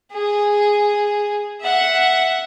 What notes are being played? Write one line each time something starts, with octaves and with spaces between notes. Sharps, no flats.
G#4
E5 F#5